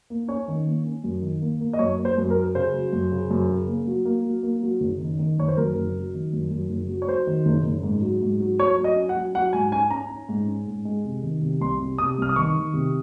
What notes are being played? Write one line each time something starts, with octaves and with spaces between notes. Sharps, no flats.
A#3
C#4 C#5
D#3
A#3
C#4
F#2
D#3
A#3
A#3
D#5
F#2 C#5
A#3
C5
F#2
A#4
F#3
C#3 C5
F#3
F#2
C#3
F#2
C#3
A#3
F#3
A#3
F#3
A#3
F#3
F#1
D#3
D#3
F#1 C#5
C5
F#2 A#4
F#1
F#3
D#3
F#2
F#2
F#1
F#3
C#5
F#3 C5
D#3
F#1
F#1
G#2
F#3
G#2
F#3
F#3 C#5
F#3
D#5
C#4
F#5
F#3
F#3 F#5
G#2 G#5
C#4 G#5
C#4 A#5
C#4
G#2
C#4
G#2
G#3
C3
D#3
C3
C2 C6
C3
C3 D#6
C2 F6
D#6
D#3 C#6
D#3
C3